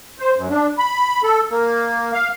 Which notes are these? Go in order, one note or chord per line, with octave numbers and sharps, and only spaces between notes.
C5
F#2
D4
B5
A4
A#3
F5